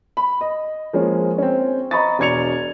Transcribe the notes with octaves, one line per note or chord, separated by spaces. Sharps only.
B5
D#5
F3 G#3 A#3 C#4
C4 C#4
D#5 A#5 B5 C#6 D#6 A6
E1 D5 G#6 C#7 F7